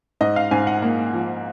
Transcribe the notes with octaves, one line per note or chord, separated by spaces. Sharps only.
G#2 D#5
F5
G#2 G#5
F#5
A#3
F3